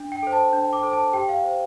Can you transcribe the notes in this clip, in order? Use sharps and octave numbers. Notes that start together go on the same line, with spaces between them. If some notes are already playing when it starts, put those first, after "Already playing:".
Already playing: D4
G5
A4 C5
A5
D4
D6
A4 C5
A5
G4 G5
F5
C5